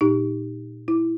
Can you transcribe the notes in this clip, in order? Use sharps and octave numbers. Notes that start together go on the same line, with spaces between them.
A#2 D#4 G4
E4